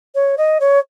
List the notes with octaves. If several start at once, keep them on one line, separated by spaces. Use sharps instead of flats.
C#5
D#5
C#5